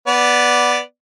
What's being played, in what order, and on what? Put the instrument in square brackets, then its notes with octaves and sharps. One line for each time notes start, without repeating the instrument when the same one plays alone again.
[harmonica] B3 D5